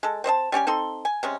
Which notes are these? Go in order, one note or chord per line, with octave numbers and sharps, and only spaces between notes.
G#3 A4
C4 C5 D#5 A5
G3 C#4 G4 G#5
C4 D#4 A4 C6
G#5
C3 G#3 C#4